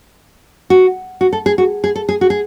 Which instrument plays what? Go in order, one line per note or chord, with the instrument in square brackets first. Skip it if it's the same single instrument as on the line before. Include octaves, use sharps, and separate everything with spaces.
[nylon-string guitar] F#4
F#4
A4
G#4
F#4
G#4
A4
G#4
F#4
G#4